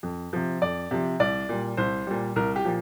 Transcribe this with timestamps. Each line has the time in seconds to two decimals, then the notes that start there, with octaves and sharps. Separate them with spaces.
0.03 F2
0.33 C3 F3
0.62 F2 D5
0.91 C3 F3
1.20 C2 D5
1.49 A#2 G3
1.77 C2 C5
2.07 A#2 G3
2.36 C2 A#4
2.56 G4
2.65 A#2 F3